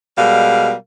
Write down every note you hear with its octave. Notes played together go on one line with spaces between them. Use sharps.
B2 G3 G#3 A#4 F5